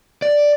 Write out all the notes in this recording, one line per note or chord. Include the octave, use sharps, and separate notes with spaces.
D5